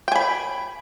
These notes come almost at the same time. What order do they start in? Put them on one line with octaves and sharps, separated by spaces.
G5 G#5 B5